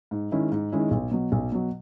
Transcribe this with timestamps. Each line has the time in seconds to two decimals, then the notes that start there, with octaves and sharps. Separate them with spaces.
0.11 G#2
0.31 D#3 G#3 C#4 E4
0.52 G#2
0.72 D#3 G#3 C#4 E4
0.91 B1
1.11 B2 F#3
1.32 B1
1.52 B2 F#3